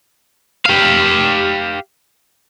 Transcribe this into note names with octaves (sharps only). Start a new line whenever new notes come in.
G4 F5